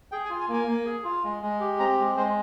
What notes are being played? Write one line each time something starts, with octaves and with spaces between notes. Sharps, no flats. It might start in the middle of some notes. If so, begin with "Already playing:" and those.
G#4 G5
G#5
F4
G#5
A#3
G#5
A#3
G#4
F4
G#3
G#3
G4
C4 A#5
G#3
G#3 C5